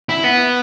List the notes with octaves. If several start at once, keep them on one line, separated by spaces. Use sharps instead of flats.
E4
B3